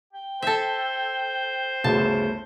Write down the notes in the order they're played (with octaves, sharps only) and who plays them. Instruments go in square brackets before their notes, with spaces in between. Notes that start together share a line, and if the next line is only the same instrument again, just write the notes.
[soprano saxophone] G5
[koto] A4 E5 [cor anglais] C5
[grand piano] G1 D2 C#3 [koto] A5